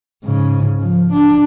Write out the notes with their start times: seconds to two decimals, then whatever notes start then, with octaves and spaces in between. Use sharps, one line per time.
0.24 G#2 C#3
0.81 F3
1.12 D4